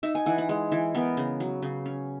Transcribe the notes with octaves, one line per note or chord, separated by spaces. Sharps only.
D#4 E5
G#5
E3 F#5
F#5
G#3
E3
B3 A#4
C#3
F#3
C#3
C#4